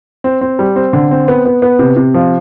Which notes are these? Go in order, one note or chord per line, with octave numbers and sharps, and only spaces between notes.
C4
C4
G3
C4
D3
C4
B3
B3
B3
C3
C3
F3